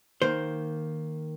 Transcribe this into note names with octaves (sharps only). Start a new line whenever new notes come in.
D#3 A#3 C5